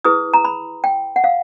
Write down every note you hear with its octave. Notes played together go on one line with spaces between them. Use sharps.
E4 G#4 B4 D#6
A#5
B5
G5
F#5
F5